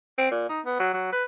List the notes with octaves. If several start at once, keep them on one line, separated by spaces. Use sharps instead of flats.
C4
A#2
D#4
B3
F#3
F#3
B4